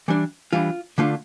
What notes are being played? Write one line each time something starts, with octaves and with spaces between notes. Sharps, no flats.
E3 G3 D4
E3 G3 D4 F4
D3 A3 D4 F4